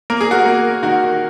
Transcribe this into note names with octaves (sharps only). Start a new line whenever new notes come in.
A#3 A#4
G#4
F#4 A#4
A#3
D#3 F#4 A#4